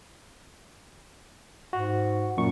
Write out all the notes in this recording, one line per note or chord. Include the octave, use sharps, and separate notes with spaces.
G#2 F#4
F#2 A#2 C#6